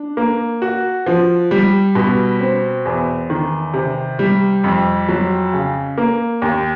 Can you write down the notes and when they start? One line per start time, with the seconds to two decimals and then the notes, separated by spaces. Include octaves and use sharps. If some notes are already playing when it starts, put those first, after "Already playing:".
Already playing: D4
0.17 A#3
0.62 F#4
1.06 F3
1.51 G3
1.95 B2
2.40 C4
2.85 E2
3.30 D#3
3.74 C3
4.19 G3
4.64 F2
5.08 F#3
5.53 C#3
5.98 A#3
6.42 D#2